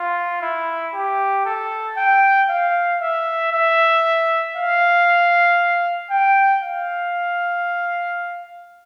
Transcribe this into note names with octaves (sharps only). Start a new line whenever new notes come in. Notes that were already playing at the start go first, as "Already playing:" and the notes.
Already playing: F4
E4
G4
A4
G5
F5
E5
E5
F5
G5
F5